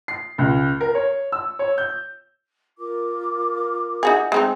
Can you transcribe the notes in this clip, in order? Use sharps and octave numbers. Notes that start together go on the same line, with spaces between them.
C7
C#2
A#4
C#5
E6
C#5
G6
F4 A#4 D6
D#4 F#4 G#4
G#3 C4 D#4